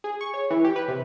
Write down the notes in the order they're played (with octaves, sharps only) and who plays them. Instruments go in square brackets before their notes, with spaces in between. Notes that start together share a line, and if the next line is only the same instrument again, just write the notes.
[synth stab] G#4
C#6
C#5
E3
G4
B4
C3